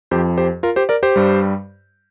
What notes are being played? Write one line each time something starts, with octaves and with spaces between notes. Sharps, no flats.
F2 F3 G4 C5
G4 C5
F4 A#4
G4 C5
A#4 D5
G4 C5
G2 G3